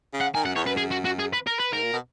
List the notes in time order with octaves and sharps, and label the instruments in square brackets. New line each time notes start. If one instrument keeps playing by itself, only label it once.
[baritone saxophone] C#3
[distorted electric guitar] F#5
[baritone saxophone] D#3 [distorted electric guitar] G#5
[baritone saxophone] F#2 [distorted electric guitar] F#5
[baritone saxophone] E2 [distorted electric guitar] C#5
[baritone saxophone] F#2 [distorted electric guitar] B4
[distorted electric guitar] G#4
F#4
F#4
G#4
B4
A#4
B4
[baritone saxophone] G#2 [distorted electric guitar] A#4
[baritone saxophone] A#2
B2